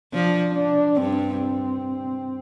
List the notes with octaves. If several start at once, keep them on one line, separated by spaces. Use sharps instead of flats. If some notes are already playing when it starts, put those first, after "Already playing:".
F3 D4
D4
G2 C4
C4